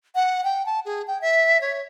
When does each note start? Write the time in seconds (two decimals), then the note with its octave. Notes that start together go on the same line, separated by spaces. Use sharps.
0.15 F#5
0.44 G5
0.66 A5
0.85 G#4
1.07 G5
1.21 E5
1.61 C#5